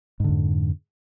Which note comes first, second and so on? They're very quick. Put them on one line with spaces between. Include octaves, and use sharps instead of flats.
G#2 D3 F2